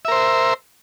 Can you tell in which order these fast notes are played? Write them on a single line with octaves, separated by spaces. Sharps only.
E5 A#4 C5